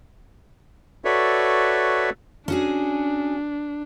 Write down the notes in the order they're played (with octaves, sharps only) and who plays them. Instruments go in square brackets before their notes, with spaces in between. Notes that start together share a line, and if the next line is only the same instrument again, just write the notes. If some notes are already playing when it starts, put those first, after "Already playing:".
[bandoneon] F#4 A4 B4 C#5 D5 E5
[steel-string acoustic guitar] C#4 F#4 G#4 [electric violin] D4